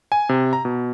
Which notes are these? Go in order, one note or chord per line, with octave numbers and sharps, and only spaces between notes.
G#5
C3
A#5
B2